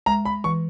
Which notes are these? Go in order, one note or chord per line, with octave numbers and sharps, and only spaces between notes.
G#3 A#5
B5
E3 C#6